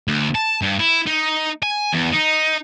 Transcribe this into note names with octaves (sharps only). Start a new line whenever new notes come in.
D2
A5
G2
E4
D#4
G#5
E2
D#4